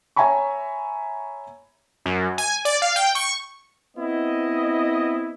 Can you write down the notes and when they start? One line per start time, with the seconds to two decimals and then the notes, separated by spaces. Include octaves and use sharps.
0.16 C#5 E5 G#5 A#5 B5 C#6
2.06 F#2
2.38 G#5
2.65 D5
2.82 F5
2.96 G5
3.15 C#6
3.97 B3 C4 E4 D#5